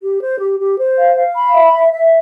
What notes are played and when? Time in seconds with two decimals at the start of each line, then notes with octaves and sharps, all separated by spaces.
0.02 G4
0.21 C5
0.39 G4
0.59 G4
0.78 C5
0.97 F5
1.16 F5
1.35 B5
1.54 E5
1.73 E5
1.92 E5